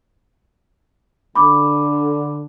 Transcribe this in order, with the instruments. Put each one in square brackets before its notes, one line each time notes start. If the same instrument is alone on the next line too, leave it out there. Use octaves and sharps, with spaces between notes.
[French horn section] D3 [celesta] B5 D6